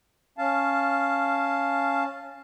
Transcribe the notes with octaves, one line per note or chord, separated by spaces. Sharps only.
C#4 F5 A5